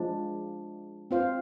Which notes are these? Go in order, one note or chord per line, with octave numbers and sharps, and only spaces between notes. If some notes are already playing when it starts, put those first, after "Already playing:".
Already playing: F3 G#3 D4
C4 F4 C5 F5